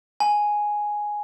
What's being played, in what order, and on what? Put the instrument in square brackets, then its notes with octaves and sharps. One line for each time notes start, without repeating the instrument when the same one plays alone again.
[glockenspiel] G#5